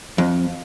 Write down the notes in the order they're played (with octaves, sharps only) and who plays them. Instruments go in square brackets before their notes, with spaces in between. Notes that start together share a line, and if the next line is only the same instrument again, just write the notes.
[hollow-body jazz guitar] F2